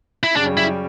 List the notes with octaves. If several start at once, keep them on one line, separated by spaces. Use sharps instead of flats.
E4
F#2 C#3 G3 D4
E4